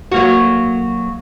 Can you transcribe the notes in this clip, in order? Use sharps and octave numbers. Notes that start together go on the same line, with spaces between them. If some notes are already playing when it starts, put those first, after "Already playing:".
F#3 A#3 F#4